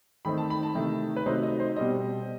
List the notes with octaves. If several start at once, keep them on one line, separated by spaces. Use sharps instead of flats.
D#3 A3 C4 D#4 B5
A5
B5
A5
C3 D#3 A3 E4
B4
C3 F#3 A3 D#4 C5
D#5
C5
B2 G3 C4 D#5